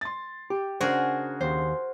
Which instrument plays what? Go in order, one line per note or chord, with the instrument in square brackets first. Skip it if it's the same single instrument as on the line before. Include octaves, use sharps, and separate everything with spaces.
[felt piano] C6 A6
[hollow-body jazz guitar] G4
[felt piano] C#3 D4 [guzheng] F#4 G#4 A#4 [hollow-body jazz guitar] C5
[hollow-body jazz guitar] D#2 [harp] C5